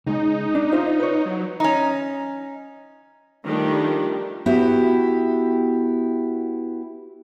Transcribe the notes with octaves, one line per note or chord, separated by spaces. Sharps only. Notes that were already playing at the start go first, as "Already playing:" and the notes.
C#2 G#3 D#4
D4
F4 C5 E5
B4 C#5
F#3
C#4 D#4
D#3 F3 G3 A3 D4 G4
B3 E4 F#4 G4